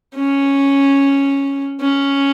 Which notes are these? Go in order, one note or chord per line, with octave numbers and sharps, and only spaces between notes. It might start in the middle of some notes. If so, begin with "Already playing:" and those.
C#4
C#4